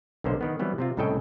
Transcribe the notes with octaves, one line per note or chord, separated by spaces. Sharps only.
B1 D3 A#3 C5
D#3 B3
E3 F#3 G3 B3 C4
C3 C4 F4
C2 A2 C#3 A4 D#5 G5